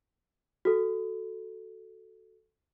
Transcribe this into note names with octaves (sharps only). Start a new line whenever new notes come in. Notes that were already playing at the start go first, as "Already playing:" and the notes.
F#4 A4